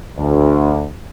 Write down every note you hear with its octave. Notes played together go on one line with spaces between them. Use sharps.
D2